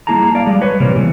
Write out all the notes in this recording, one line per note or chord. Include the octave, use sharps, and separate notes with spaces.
G3 A#3 E4 G#4 A5 A#5
D5 F5
G3 G#3
B4 C#5
C3 E3 G3 A#3
E3 B3